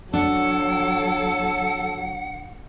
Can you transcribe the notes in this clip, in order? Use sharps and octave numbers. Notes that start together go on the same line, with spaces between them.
F#3 D4 A4 F#5